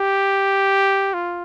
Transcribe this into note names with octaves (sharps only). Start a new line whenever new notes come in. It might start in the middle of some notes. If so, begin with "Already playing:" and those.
Already playing: G4
F4